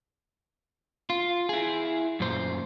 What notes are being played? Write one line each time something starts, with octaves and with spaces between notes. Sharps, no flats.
F4
E4 G#4
F#2 A#2 C5